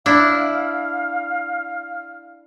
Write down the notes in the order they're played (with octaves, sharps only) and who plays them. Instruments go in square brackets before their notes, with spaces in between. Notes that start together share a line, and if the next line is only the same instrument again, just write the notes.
[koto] D4 E4 [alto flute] F5